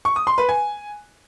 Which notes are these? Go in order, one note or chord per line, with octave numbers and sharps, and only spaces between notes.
C#6
D#6
C6
B4
G#5